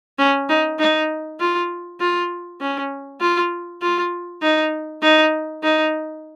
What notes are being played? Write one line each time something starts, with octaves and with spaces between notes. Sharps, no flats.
C#4
D#4
D#4
F4
F4
C#4
F4
F4
D#4
D#4
D#4